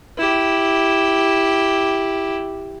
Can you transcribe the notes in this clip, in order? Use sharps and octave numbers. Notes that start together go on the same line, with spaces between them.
E4 G4